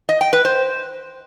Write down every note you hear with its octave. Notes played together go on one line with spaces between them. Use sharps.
D#5
G5
B4
C5